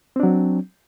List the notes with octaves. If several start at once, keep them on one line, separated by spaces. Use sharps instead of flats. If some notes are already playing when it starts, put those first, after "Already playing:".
F#3 C4 D4